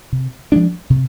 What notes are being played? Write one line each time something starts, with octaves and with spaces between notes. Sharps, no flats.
C3
F3 G#3 D4
C3